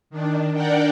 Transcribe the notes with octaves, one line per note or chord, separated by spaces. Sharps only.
D#3 D4
D4 A#4 D5 F#5 G5